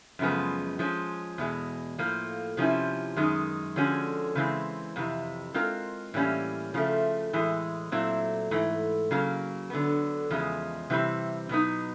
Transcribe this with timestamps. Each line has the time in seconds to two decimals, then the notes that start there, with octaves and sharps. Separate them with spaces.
0.19 F#2 C#3 F3 G#3 B3
0.79 F3 G#3 C#4
1.38 E2 B2 G#3
1.98 A2 F3 A#3
2.57 C3 F3 G#3 C#4 E4
3.16 F#2 D#3 G#3
3.76 D3 F3 G#3 C#4 F#4
4.35 C#3 E3 G#3 C4
4.96 F2 C3 E3
5.54 G#3 C4 F4 A#4
6.14 A2 E3 G3 A#3 C#4
6.74 C#3 F3 A3
7.33 A2 E3 G#3
7.92 A#2 F#3 A3 C4 E4
8.51 G#2 E3 A3
9.11 C#3 F#3 A#3
9.70 D3 F#3 B3
10.30 E2 C#3 F3 G#3
10.90 C3 E3 G3 C4
11.49 B2 F#3 B3 D#4